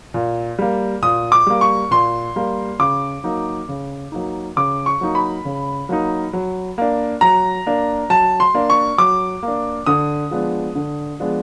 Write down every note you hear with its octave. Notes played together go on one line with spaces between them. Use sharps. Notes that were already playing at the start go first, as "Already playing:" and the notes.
A#2
G3 A#3
A#2 D#6
D6
G3 A#3
C#6
A#2 C6
G3 A#3
C#3 D6
F#3 A#3 D#4
C#3
F#3 A#3 D#4
C#3 D6
C#6
F#3 A#3 D#4
B5
C#3
F#3 A#3 D#4
F#3
A#3 D4
F#3 A#5
A#3 D4
F#3 A5
C6
A#3 D4
C#6
F#3 D6
A#3
D4
D3 D#6
F3 G#3 B3 D4
D3
F3 G#3 B3 D4